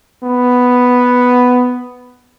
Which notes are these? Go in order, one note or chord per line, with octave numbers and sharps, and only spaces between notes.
B3